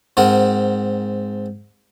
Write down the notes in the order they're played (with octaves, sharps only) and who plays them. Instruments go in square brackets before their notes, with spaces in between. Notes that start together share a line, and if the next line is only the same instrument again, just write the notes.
[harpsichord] G#2 C4 A#4 F#5